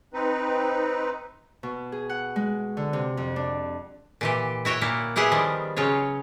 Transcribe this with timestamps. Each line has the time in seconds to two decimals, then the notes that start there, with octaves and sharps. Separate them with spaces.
0.14 C4 D#4 B4
1.63 B2
1.92 G#4
2.09 F#5
2.36 G#3
2.77 D3
2.93 C3
3.17 F2
3.36 D4
4.21 A#2 E3 G4
4.65 E4 F#4 C#5 G5
4.81 A#2 A#3 E4
5.16 B3 E4 G4 G#4 F#5
5.31 D#3 F3 G3
5.76 C#3 F#3 F4 C#5